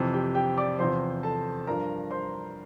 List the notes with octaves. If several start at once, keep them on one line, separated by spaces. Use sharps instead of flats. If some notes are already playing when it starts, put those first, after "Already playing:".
Already playing: F2 C3 E3
G4 G5
G4 G5
D5 D6
E2 C3 F3 C5 C6
A4 A5
G2 F3 A#4 A#5
C5 C6